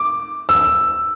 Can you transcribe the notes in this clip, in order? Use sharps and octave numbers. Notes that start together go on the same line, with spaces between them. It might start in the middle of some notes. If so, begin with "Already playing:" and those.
Already playing: D6
E6